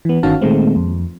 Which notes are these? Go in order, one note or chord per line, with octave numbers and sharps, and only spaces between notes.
E3 B3
G1 D#3 C#4 F#4 F5 A5
A#2 D#3 G#3 A3 C4
F2